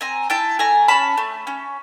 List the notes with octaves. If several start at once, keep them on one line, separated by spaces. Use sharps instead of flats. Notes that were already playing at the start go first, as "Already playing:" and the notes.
C4 G#5 A#5
E4 G5 A5
A3 G#5 A#5
C#4 A5 B5
A3
C#4